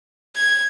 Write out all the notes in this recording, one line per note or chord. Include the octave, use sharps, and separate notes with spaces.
G#6